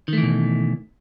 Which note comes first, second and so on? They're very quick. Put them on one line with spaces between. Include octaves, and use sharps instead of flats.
D#3 A3 E3 B2